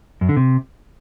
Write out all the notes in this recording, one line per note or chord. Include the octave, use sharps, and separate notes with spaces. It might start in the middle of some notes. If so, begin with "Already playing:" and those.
F#2
D3
C3